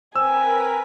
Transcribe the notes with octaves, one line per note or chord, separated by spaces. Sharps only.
C4 A#4 B4 G#5 E6 B6